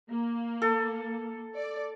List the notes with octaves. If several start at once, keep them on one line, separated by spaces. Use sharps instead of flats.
A#3
A4
D5